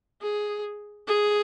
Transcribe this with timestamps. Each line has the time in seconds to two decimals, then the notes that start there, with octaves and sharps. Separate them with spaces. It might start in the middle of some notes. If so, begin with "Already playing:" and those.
0.22 G#4
1.08 G#4